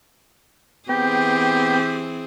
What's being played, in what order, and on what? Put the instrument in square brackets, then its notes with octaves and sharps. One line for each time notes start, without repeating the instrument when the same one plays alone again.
[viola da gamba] E3 C4 G#4 [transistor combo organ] B3 G5 [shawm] G4